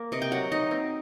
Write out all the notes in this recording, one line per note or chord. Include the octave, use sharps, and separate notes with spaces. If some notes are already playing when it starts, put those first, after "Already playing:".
Already playing: A#3
C3 D#5
G5
F#3 F#5
D#4 D#5
C4